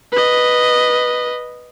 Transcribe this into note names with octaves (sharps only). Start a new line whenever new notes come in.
B4 D#5